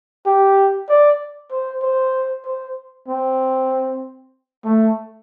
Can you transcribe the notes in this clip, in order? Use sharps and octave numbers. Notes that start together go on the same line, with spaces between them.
G4
D5
C5
C5
C5
C4
A3